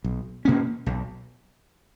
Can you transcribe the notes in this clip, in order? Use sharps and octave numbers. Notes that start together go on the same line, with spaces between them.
B1
B2 A#3 C#4
B1